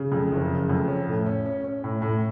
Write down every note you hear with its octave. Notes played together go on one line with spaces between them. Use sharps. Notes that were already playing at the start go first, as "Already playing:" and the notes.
Already playing: C#3
F2
F#1
C#3
F2
C#4
A2
C#4
C#4
C#4
A2
A2